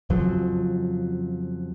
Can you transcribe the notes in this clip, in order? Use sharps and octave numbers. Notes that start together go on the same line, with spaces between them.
F2 C#3 F3 F#3